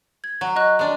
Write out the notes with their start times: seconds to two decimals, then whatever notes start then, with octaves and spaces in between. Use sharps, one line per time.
0.24 G#6
0.41 F#3
0.56 D#5 C#6 F#6
0.79 G#3 D4